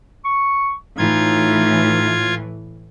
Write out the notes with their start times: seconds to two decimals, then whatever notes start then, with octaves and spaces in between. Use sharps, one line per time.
0.24 C#6
0.98 A2 E3 D#4 F4 G#6